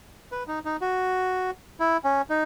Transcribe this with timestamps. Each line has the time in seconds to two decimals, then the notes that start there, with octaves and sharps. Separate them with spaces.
0.32 B4
0.48 D#4
0.65 D#4
0.81 F#4
1.80 E4
2.04 C#4
2.30 D#4